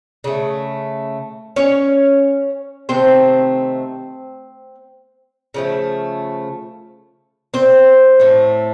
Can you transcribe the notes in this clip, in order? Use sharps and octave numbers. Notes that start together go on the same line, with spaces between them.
C#3 A3
C#4 C#5
C3 D#3 A3 C4 C5
C#3 F3 A3
C4 C5
A2 A3